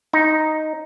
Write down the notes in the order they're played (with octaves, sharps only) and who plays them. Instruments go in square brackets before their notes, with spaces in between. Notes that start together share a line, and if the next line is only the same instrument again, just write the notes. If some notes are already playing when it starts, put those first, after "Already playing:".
[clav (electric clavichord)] D#4